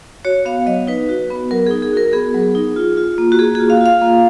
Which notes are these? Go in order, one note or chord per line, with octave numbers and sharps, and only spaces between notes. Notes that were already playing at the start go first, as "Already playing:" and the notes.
F#4 C#5
B3 F5
F#3 D#5
D#4 B4
F#4
B3
F#3 A#4
D#4 G#4
G#4
F#4 A#4
B3 G#4
F#3
D#4
F4
F4
A#3
F#4
A#3 G#4
F4 G#4
F5
F4 F5
A#3